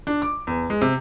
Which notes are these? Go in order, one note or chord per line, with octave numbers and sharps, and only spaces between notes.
D4
D6
E2
G#3
C3